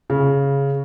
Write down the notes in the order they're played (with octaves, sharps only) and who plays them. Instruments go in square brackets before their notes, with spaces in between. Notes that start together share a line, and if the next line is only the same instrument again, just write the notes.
[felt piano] C#3